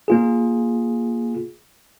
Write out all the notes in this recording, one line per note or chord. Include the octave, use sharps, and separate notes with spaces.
A#3 F4 G#4